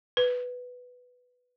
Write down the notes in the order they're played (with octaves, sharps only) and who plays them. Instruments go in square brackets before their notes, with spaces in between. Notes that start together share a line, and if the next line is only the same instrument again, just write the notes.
[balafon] B4